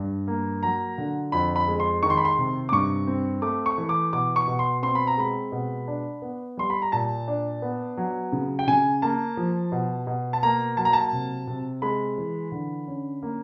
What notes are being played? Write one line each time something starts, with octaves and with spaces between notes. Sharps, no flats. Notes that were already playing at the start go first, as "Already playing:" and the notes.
Already playing: G2
A#3
F#3 A#5
D3
F2 B5
B5
G#3
C6
D#3 C#6
C6
B5
C6
C3
D6
G2 C#6
C4
A3 D6
C#6
E3
D6
B2 D6
C#6
B2
C6
C4 C6
B5
A#5
G#3 B5
B2
D4
B3
G3 C6
B5
A#5
A#2 A5
D4
B3
F#3
C#3
G5
C#3 G#5
A#3 A5
F3
B2
B2
A5
A#3 A#5
F#3 A5
A#5
A5
C3
C3
G#3 B5
E3
D3
C#4
A#3